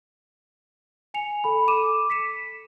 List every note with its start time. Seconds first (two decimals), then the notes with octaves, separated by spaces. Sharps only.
1.14 G#5 C#7 F7
1.44 A4 B5
1.68 A4 D6 D#7 E7
2.10 B6 C#7 E7